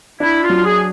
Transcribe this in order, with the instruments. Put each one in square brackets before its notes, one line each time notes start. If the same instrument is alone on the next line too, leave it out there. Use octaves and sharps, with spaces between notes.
[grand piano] D4 [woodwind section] E4
[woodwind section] F4
[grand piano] F#3
[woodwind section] G#4